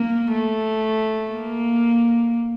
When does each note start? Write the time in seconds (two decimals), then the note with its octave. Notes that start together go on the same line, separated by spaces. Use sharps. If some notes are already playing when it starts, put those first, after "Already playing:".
Already playing: A#3
0.32 A3
1.31 A#3